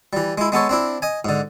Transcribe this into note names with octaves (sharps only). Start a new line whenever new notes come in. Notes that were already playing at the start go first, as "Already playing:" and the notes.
E3 G3
G#3 E4
G#3 B3 A4 C#5
C4 D4 E4
D#5 G#5
G#2 D3